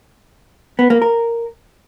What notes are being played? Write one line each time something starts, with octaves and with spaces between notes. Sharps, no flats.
B3
A#3
A#4